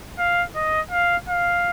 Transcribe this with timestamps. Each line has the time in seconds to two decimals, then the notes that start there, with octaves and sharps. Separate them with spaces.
0.18 F5
0.55 D#5
0.91 F5
1.29 F5